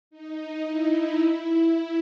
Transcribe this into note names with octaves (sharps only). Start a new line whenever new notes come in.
D#4
E4
E4
E4